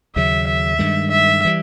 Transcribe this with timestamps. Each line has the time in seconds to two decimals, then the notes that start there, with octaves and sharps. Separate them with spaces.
0.16 D#2 C#3 F#3 E5
0.48 E5
0.79 G2 D#3 G#3
1.11 E5
1.45 E3 G3